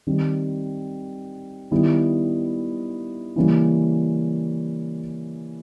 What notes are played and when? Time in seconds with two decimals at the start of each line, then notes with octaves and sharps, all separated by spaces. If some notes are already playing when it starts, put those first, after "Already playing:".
0.07 D#3 G3 C4
1.71 D#3 G3 B3 E4
3.36 C#3 E3 G3 A#3 C#4